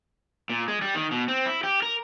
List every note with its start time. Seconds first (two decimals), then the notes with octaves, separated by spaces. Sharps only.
0.50 A#2
0.68 G#3
0.82 G3
0.95 D#3
1.11 B2
1.28 C4
1.46 E4
1.64 G4
1.83 A#4